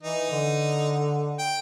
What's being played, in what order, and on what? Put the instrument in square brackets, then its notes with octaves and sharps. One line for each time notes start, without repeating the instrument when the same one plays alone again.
[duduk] E3 [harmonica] D#4
[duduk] D3
[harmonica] G5